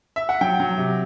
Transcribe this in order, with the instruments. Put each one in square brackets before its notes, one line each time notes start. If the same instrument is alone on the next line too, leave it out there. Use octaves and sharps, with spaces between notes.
[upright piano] E5
F#5
F#3 G5
F#3
C3